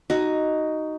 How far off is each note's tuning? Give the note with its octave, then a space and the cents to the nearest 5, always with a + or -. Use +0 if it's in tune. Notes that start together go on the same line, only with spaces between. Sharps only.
D#4 +0 F#4 +15